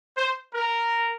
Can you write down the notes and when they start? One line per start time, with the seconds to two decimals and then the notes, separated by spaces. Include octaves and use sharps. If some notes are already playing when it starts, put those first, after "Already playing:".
0.16 C5
0.54 A#4